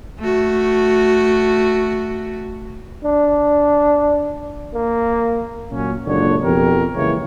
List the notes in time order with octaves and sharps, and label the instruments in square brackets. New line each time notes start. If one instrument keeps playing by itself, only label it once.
[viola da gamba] A3 F#4
[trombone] D4
A#3
[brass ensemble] A#2 F#3 C#4
F#1 C#2 A#2 D3 D4 C#5
F2 B2 B3 G4 A#4
C#3 E3 G#3 A#3 E4 C#5